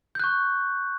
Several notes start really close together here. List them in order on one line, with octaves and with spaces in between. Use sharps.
G6 F#6 C#6